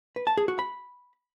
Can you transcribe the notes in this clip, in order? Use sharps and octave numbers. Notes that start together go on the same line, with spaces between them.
B4
A5
G#4
F#4
B5